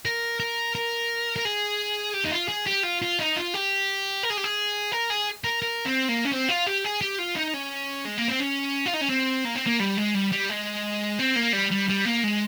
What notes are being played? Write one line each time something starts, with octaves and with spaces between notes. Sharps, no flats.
A#4
A#4
A#4
A#4
G#4
G4
D#4
F4
G#4
G4
F4
F4
D#4
F4
G4
A#4
G#4
G4
G#4
A#4
G#4
A#4
A#4
C4
A#3
C#4
C4
F4
G4
G#4
G4
F4
D#4
C#4
G#3
A#3
C4
C#4
F4
D#4
C#4
C4
A#3
C4
A#3
G3
G#3
G3
G3
G#3
C4
A#3
G3
G3
G3
A#3
G#3